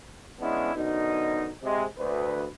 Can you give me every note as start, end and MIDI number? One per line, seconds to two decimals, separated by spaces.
0.40 0.74 52
0.40 0.74 56
0.40 0.74 59
0.40 0.74 61
0.40 0.74 62
0.40 0.74 64
0.75 1.49 42
0.75 1.49 47
0.75 1.49 50
0.75 1.49 63
1.63 1.83 48
1.63 1.83 56
1.97 2.45 38
1.97 2.45 71